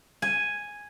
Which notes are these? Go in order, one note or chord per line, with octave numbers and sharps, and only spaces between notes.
G#5